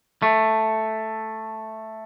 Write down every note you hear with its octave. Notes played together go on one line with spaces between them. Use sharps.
A3